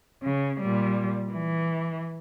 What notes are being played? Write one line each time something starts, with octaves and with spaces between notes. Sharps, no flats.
C#3
A#2 G3
E3